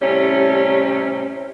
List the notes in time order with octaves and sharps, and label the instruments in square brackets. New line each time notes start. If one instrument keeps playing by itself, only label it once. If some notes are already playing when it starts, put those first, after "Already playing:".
[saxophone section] A2 C3 G3 C#4